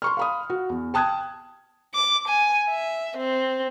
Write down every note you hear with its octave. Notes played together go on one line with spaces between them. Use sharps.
C6 C#6 F6
F5 B5 D#6
F#4
E2
G5 A5 D#6 F#6 G#6
D6
G#5
E5
C4